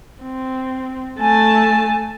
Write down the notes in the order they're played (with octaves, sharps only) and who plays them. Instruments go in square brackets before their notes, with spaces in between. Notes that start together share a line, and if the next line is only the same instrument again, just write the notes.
[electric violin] C4
[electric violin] A3 A5 [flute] G#5